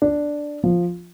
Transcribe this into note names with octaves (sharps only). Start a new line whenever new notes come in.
D4
F3